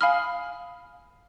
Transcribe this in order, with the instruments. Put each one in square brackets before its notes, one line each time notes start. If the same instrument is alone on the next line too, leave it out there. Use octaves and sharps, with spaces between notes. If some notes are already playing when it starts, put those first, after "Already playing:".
[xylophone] F5 G#5 B5 D#6 F6